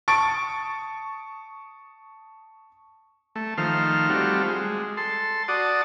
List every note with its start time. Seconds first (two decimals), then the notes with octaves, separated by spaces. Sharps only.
0.08 A5 C#6 D#6 A6 D7
3.35 A3
3.58 D#3 F3 A3 C5 F6
4.09 G3 A3 C4 F4 F#4
4.48 G#3
4.97 A4 C6
5.48 F#4 D5 A5 D#6